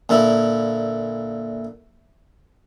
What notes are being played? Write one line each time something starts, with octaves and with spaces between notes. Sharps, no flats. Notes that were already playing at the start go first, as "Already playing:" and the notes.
A#2 D3 E4